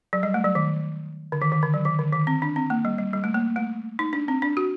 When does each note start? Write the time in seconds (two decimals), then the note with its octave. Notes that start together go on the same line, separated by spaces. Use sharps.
0.13 F#3
0.23 G3
0.34 A3
0.44 F#3
0.55 D#3
1.32 D3
1.42 D#3
1.52 D#3
1.63 D3
1.74 F#3
1.85 D#3
1.99 D3
2.13 D#3
2.27 C4
2.42 D4
2.56 C4
2.70 A#3
2.85 G3
2.98 G3
3.13 G3
3.24 A3
3.35 A#3
3.56 A3
3.99 D#4
4.13 D4
4.28 C4
4.42 D4
4.57 F#4